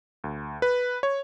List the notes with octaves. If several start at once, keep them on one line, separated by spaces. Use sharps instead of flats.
D2
B4
C#5